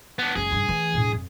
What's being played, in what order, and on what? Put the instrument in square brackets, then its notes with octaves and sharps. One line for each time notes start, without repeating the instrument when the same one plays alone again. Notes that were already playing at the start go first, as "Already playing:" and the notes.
[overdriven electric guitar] B3 D4
[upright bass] F#1 G#3 [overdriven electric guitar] G#4
[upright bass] G2 C#3
E3 A3
E1 A2
F2